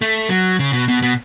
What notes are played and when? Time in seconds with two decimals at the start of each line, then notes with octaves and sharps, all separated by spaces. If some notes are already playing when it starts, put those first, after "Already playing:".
0.01 A3
0.30 F#3
0.59 C#3
0.73 B2
0.88 B2
1.02 B2